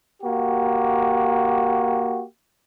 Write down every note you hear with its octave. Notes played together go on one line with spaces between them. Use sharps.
A#3 F#4 G4